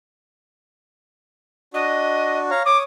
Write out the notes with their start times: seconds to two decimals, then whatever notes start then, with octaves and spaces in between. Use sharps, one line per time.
1.74 D4 F#4 D#5
2.51 C#5 F5 A#5
2.65 C#5 D6 D#6